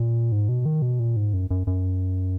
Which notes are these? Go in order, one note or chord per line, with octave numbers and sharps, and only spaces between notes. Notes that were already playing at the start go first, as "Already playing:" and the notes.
Already playing: A#2
G#2
B2
D#3
B2
A#2
G#2
F#2
F#2
F#2